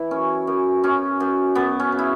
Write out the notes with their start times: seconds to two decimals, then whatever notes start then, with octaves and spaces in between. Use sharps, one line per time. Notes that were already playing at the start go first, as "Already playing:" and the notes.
Already playing: E3 E4
0.11 F#2 C#4
0.47 F#2
0.83 F#2 C#4
1.20 F#2
1.55 F#2 B3
1.80 C#4
1.92 C#3
1.99 E4